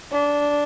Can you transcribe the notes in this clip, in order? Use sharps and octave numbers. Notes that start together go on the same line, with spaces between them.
D4